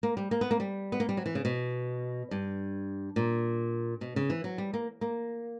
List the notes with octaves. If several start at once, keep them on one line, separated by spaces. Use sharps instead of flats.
A#3
G3
A#3
B3
A#3
G3
B3
A#3
G3
F#3
E3
C#3
B2
G2
A#2
B2
C#3
E3
F#3
G3
A#3
A#3